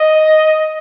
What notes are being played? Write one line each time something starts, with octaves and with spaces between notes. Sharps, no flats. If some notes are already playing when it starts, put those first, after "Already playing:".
Already playing: D#5